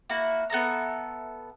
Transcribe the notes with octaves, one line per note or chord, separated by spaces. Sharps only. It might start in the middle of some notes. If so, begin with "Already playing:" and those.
A#3 E4 F#4
B3 A4 E5 A#5